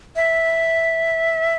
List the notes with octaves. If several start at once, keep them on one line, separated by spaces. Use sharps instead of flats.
E5